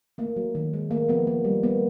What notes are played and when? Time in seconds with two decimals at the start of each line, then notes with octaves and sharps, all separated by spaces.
0.18 A3 A#3
0.37 F#3
0.55 D#3
0.73 G#3
0.91 A3 A#3
1.09 F3 B3
1.27 A#3
1.45 G3
1.63 A#3 B3